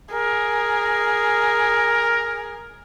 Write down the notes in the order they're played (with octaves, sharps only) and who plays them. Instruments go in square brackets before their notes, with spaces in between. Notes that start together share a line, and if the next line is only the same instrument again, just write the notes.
[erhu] G#4 [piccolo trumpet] A#4